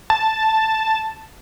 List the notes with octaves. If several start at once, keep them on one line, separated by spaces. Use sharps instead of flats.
A5